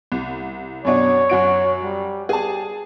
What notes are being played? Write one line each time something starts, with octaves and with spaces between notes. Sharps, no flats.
C2
F#2 B2 D4 C#5
F#2 F#4 D7
G3
G4 G#4 A5